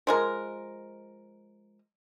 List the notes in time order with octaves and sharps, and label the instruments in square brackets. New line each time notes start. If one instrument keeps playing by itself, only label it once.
[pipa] F3 G#3 A#4